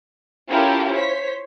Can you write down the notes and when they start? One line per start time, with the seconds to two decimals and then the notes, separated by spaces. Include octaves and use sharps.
0.48 C#4 E4 F4 G4 A4 A#4
0.92 C5 C#5 B6